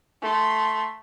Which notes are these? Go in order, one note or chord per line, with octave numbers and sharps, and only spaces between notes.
A3 C6